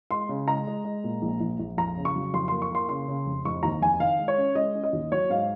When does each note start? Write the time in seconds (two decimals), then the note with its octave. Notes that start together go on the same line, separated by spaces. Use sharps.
0.11 G#3 C6
0.29 C#3
0.48 G#3 A#5
0.67 G#3
0.85 G#3
1.04 A#2
1.22 A#1
1.40 A#1
1.59 A#1
1.77 F2 A#5
1.97 C#3
2.05 C#6
2.16 F#3
2.34 F2 C6
2.48 A#3 C6
2.62 C#6
2.71 A#3 C6
2.89 C#3 C6
3.08 C#3
3.26 F1
3.45 F1 C#6
3.63 D#2 A#5
3.81 F1 G#5
4.00 D#3 F5
4.19 G#3
4.28 C#5
4.38 C#4
4.55 G#3 D#5
4.75 C#4
4.84 D#5
4.93 D#2
5.12 F#3 C#5
5.30 G#2 F5